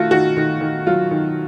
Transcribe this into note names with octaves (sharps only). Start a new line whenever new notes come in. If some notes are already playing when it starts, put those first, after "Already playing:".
Already playing: D#3 A3 F4 F#4
D#3 F#4
D#3
D#3
F#3 F4
D#3